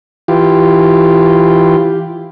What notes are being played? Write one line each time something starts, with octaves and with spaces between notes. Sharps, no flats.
E3 F4 G4